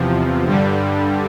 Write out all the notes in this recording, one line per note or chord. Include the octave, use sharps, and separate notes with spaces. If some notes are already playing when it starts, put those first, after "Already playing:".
Already playing: E2 C3 F3
G2 D3 G3